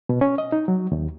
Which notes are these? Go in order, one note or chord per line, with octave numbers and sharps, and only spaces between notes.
B2
C#4
D#5
D#4
F#3
D#2